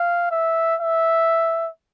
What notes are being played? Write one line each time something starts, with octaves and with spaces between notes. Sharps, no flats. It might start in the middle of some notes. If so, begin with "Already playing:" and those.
Already playing: F5
E5
E5